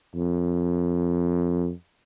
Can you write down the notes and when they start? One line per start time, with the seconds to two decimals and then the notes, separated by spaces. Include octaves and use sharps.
0.15 F2